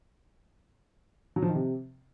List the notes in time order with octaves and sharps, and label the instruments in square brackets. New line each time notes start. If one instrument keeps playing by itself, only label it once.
[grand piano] F#3
F3
D#3
C3